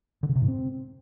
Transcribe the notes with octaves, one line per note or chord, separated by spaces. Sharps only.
D3
C#3
C3
G#2
C4